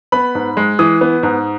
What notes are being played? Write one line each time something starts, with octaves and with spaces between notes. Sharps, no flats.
B3 B5
G#2
G#3
E3 D#6
B3
G#2